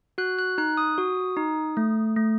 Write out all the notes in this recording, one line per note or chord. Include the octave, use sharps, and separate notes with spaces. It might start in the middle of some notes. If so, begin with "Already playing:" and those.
F#4 F#6
F#6
D#4 F#6
D#6
F#4
D#4
A3
A3